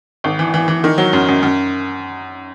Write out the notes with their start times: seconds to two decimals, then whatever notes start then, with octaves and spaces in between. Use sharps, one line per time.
0.24 G#1
0.39 E3
0.54 E3
0.68 E3
0.84 D#3
0.98 F#3
1.13 F#2
1.28 F#2
1.43 F#2